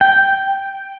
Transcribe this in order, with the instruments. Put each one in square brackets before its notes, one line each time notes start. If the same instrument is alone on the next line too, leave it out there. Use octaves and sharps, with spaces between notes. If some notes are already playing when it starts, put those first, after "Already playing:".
[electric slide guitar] G5